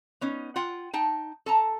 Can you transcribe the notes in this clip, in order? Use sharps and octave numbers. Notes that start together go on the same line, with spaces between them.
B3 C#4 D#4
F4 F#5 G5
D#4 G5 A5
A4 A5 A#5